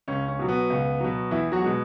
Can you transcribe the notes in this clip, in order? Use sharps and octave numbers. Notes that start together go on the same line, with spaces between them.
C#2 C#4
C#4
B2 F#3
B3
C#2
B2 F#3
E2 E3 E4
F#3 F#4
B2 G#3